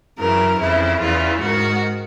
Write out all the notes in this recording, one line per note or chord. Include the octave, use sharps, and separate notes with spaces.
F#2 C#3 E3 A#4
F2 C#3 E3 E4
E2 C#3 E3 F4
G#2 D#3 F#4